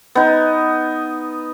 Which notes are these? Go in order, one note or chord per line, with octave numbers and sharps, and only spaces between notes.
B3 D#4